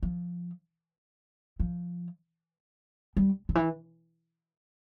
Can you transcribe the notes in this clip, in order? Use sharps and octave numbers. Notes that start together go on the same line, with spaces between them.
F3
F3
G3
D3
E3